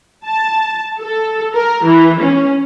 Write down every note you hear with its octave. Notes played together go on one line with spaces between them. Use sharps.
A5
A4
A#4
E3
C#4